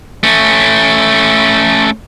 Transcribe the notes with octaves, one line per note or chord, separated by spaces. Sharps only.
A3 C#4